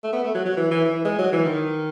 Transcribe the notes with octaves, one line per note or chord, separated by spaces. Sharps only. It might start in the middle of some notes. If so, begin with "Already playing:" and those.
A3
B3
A3
F#3
F#3
E3
E3
E3
G#3
F#3
E3
D#3